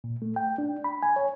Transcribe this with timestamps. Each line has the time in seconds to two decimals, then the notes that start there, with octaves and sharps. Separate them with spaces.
0.04 A#2
0.22 A3
0.36 G5
0.58 D4
0.84 B5
1.03 G#5
1.16 C#5